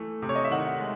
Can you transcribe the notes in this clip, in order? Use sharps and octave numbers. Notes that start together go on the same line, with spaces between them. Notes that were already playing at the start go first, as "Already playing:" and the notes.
Already playing: E3 A3
C3
C#5
D#5
E5
D#3 F#5
G#3